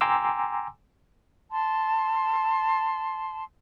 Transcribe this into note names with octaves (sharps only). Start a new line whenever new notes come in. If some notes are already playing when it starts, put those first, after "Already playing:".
G5 G#5 A#5 C6 D6 E6
A5 C6